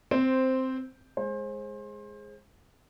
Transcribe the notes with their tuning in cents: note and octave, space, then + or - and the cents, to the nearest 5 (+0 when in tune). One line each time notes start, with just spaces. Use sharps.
C4 -5 C5 +0
G#3 +0 C5 +30